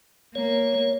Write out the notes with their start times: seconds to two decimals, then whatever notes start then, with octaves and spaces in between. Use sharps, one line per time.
0.35 A#3 C#5